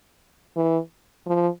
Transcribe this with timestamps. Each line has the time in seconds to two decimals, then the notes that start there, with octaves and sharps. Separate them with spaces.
0.57 E3
1.27 F3